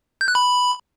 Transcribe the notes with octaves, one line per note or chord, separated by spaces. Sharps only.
G6
F#6
B5